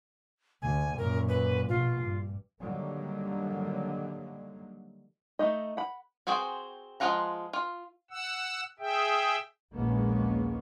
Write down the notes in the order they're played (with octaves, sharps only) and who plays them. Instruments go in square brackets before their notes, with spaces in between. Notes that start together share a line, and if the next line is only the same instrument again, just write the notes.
[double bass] D2 [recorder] G#5
[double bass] F#2 A#2 [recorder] A#4
[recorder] B4
[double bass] A#1 B2 [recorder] F4
[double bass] G2
[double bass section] D3 D#3 F#3 G3 A#3
[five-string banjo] A3 D#4 D#5
F#5 B5
C4 F#4 G#4 C5 G5
F3 G#3 F4 F#5 A#5
F4
[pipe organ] F#5 E6
G#4 E5 G5
[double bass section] A#1 D#2 G#3 A#3 B3 C#4